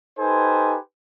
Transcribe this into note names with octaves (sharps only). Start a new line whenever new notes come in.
D#4 G4 A4 B4 C5 G#5